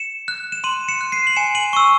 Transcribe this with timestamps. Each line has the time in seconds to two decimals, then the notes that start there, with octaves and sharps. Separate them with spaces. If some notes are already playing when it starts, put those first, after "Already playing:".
Already playing: C#7 E7
0.28 F#6
0.52 E7
0.64 C6 D#7 F#7
0.88 C#7 E7
1.01 F#6
1.12 C7 D#7
1.27 F#7
1.36 G#5 C#7 E7
1.55 D#7 F#7
1.73 C#6 E6